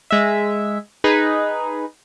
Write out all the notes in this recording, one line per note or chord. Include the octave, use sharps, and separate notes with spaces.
G#3 E5
D#4 G#4 B4